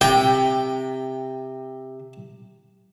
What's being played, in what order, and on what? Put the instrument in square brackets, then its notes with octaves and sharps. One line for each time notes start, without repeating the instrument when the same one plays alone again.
[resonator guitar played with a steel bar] C3 [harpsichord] G5